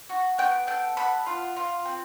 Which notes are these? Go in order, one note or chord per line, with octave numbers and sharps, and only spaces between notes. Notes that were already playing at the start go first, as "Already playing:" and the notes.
F#4
B3 G5
A4 G5
B3 B5
F4
F4
C4